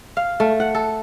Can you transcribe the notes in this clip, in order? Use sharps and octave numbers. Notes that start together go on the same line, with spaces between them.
F5
A3
F#5
A4